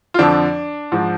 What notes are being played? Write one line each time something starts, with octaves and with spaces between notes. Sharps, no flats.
F4
F2 D3 F3 D4
G#2 F3